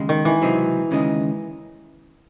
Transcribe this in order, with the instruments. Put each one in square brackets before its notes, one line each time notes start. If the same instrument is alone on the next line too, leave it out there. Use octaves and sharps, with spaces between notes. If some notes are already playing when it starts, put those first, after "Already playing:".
Already playing: [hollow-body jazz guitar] D#2 C#3 G#3
[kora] D#3
E3
[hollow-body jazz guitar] C#2 C3 F#3 C4 D#4
D#2 C#3 G#3 D#4